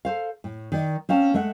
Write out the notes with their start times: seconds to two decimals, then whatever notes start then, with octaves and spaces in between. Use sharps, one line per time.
0.05 A4 C5 F5
0.44 A2
0.72 D#3 D5
1.09 C4 C#4 F5 A5
1.34 G#3 A3 E5 F#5